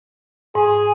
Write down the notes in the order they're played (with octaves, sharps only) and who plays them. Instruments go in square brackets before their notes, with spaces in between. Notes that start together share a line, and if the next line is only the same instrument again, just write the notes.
[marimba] G#2 [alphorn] G#4